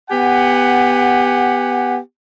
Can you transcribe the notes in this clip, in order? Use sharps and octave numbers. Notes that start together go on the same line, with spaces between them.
B3 G4 F#5 G#5